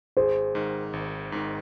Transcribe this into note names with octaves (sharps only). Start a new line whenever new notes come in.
G#1 G#4 C5
G#2 D#3
G#1
G#2 D#3